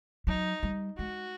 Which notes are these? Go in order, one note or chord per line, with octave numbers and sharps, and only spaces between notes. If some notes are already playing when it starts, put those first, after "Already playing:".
F#3 D#4
G3
G#3 F#4